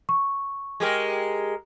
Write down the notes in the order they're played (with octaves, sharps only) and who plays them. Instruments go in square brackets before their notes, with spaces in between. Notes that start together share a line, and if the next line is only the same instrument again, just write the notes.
[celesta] C#6
[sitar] G#3 G4 A#4